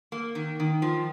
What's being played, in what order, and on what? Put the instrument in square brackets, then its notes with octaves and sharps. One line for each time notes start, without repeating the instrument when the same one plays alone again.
[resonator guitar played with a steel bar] A#3
D#3
D#3
F3